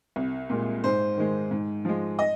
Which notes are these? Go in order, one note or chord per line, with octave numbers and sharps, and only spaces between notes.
C2
A#2 G#3
G#2 C5
D#3 G#3
G#2
F3 G#3
D#5